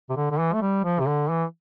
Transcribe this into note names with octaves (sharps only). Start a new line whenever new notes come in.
C3
D3
D3
E3
A3
G3
F3
C3
D3
E3